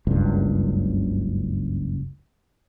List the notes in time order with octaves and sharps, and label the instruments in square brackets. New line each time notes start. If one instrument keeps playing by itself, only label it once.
[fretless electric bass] F#1 C#2 G2